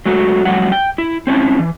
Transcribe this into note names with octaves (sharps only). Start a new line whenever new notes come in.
F#3 G#3 A3 F#4
F2 A2 F#3 G3 F#5
G5
E4
C4 C#4 E4
E3